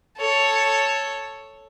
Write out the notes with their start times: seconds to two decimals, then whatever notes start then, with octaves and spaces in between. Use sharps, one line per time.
0.17 A4 C#5